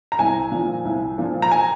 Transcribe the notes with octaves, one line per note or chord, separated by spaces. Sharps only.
A#5
C2 G#5
A#2 F3
C2
A#2 F3
A#5
G#5